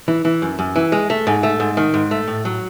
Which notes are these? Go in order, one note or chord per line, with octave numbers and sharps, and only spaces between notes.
E3
E3
F#2
F#2
E3
G#3
A3
G#2
A3
G#2
D#3
G#2
A3
A2
F#3